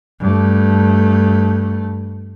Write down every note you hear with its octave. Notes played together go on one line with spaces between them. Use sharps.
G2 A3